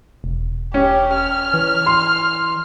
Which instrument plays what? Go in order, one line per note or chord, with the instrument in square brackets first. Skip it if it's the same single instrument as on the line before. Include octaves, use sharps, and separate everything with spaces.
[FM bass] E1
[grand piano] C#4 [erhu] G4
[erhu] F6
[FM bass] E3
[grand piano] C6